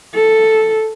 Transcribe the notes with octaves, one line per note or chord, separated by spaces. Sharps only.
A4